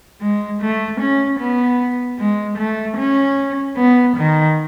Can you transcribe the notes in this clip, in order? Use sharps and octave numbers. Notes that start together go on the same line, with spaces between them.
G#3
A3
C#4
B3
G#3
A3
C#4
B3
D#3